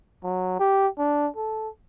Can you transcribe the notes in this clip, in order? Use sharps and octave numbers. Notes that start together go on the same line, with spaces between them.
F#3
G4
D4
A4